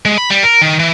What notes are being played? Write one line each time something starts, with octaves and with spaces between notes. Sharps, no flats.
G#3
B5
G3
A#4
D#3
E3